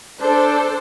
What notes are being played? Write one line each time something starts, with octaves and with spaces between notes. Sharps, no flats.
D4 A4 C5